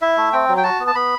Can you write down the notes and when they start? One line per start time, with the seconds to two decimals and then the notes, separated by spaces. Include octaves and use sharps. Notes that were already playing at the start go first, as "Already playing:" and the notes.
0.01 E4 E5
0.17 A3
0.33 C4 G5
0.48 F#3
0.57 G5
0.64 F#4 A5
0.80 B3
0.87 A5
0.95 B3 B5